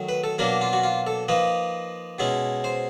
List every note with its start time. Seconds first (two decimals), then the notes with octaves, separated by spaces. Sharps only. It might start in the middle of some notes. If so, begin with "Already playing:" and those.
Already playing: D#3 F#3 A3
0.09 B4
0.24 A4
0.38 B2 F#3 A#3 D4 A#4
0.61 F4
0.73 F#4
0.83 F4
1.07 A4
1.29 F3 A#3 D#4 B4
2.19 B2 G#3 C#4 E4
2.64 C5